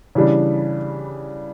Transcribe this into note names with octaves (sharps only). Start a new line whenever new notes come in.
C#3 E3 G3 D4